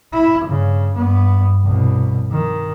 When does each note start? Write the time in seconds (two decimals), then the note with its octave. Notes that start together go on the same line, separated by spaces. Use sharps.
0.13 E4
0.44 G2 C#3
0.93 G2 B3
1.64 C2 B2
2.31 D#3